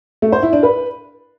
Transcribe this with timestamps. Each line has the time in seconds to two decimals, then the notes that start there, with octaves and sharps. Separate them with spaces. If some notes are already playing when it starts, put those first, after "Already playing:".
0.22 A3
0.32 C5
0.43 E4
0.53 D4
0.63 B4